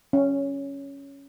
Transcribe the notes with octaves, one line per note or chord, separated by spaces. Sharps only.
C#4